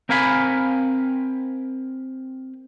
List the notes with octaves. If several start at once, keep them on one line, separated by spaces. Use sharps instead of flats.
C4 A#4 F5 G#5 B5